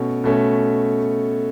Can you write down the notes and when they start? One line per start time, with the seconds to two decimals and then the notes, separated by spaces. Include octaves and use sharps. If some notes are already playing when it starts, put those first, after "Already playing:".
Already playing: B2 A3 C#4
0.24 B2 A3 C#4